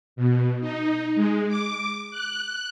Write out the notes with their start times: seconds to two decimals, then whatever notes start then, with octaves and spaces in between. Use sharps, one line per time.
0.16 B2
0.61 D#4
1.15 G#3
1.48 D6
2.11 F#6